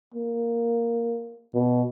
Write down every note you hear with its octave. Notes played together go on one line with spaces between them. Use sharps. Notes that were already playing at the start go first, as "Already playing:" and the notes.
A#3
B2